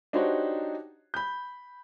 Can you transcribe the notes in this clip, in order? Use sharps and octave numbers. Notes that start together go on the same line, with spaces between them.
D4 D#4 F#4 G4 C5 C#5
B5 G6